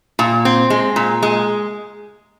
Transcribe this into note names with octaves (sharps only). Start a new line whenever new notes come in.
A#2
C4
G#3
A#2
G#3